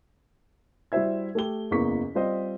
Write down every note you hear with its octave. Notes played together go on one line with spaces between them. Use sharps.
G3 E4 F#4 C5 E5 G#6
A3 G4 G7
F#1 E2 A#3 G#4 C#6 B6
G3 C4 F4 C5 D#5